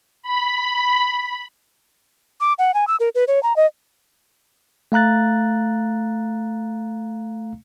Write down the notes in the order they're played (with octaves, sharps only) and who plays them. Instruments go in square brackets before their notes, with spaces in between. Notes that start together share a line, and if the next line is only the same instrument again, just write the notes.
[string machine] B5
[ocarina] D6
F#5
G#5
E6
A#4
B4
C#5
A#5
D#5
[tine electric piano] A3 F5 A#5 F#6 A6